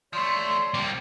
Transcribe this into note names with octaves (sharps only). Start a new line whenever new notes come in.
F3 A3 C#5 D5 C6
F3 G3 A#3 C4